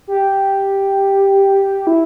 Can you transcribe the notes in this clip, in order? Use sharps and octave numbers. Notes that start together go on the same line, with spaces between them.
G4
E4